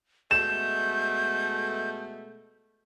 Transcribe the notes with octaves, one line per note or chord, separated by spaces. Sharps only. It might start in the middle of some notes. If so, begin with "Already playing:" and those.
B2 G#3 A3 G6 E7